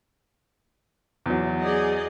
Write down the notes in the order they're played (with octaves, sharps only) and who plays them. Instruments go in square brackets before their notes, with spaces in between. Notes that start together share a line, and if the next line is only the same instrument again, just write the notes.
[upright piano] E2 F#3
[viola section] G#4 D5 D#5